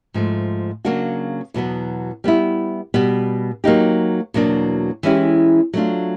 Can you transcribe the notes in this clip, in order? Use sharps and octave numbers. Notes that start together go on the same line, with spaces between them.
G#2 F3 A3
C#3 F#3 A#3 D4 F#4
E2 B2 F#3 B3
G3 B3 E4
B2 G3 B3
F#3 A#3 D#4 G4
E2 B2 F#3 A#3 D4
E3 G#3 C#4 E4 G4
F#3 A3 D4 F4